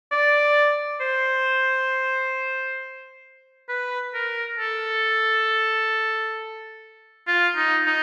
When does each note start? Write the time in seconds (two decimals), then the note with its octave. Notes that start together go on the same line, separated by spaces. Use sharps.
0.12 D5
1.01 C5
3.69 B4
4.14 A#4
4.59 A4
7.27 F4
7.57 D#4
7.87 D#4